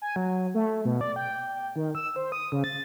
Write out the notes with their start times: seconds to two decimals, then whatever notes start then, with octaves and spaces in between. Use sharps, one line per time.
0.02 G#5
0.16 F#3
0.54 A3
0.85 B2
1.01 D5
1.16 G5
1.76 D#3
1.95 E6
2.16 C5
2.32 D#6
2.52 C#3
2.64 A6